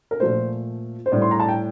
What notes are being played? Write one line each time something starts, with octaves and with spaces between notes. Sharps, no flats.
A#4
A#2 F3 A3 C5
C5
A2 G3 D5
C6
A#5
A5
G5